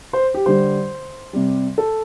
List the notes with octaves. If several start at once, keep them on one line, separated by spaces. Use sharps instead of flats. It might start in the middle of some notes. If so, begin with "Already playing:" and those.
C5
G4
D3 G3 C5
C3 G3
A4